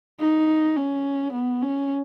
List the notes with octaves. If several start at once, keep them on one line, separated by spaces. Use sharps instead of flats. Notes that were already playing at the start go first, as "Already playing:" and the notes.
D#4
C#4
B3
C#4